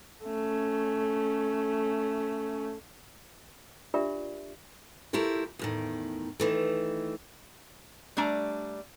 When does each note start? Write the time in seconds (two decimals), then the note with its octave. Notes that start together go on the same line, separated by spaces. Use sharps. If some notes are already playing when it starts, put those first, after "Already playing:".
0.24 A3 C#4
3.94 D4 F4 G4 A#4 D5 E5
5.13 A3 E4 F4 G4 A#4
5.59 E2 A2 D#3
6.40 D#3 E3 A3
8.17 G3 A3 D4 A#5